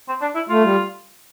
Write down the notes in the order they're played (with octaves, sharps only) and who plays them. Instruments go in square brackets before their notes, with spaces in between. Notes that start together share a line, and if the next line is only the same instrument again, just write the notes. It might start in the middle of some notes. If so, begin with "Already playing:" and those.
[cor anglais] C4
D4
E4
[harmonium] A3 [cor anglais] F4
[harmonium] G3